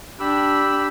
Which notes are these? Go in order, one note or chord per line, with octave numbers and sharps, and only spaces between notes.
D4 G4 B5 E6